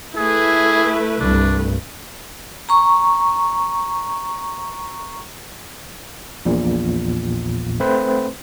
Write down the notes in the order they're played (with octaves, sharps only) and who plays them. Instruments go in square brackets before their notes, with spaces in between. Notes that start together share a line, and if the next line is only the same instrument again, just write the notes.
[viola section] A3 B4 [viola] E4 [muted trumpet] G#4
[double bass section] C2 G2 [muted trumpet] D4
[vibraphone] A#5 C#6
[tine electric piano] A#1 E2 A#2
A3 C4 B4 C5